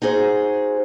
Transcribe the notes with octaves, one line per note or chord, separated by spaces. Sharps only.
D#4 F#4 G#4 C5